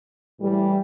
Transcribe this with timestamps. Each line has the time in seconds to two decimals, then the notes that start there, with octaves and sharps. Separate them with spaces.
0.40 A2 E3 G3